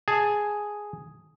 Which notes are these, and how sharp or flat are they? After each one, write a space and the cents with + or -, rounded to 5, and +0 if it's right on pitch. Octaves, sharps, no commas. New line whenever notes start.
G#4 +0 A5 +0